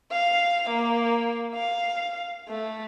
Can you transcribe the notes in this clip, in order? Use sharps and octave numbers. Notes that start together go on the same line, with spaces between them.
F5
A#3
F5
A3